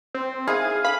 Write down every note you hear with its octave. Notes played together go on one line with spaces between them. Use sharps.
C4
D#3 G#3 E4 G#4 F5
D3 F5 B5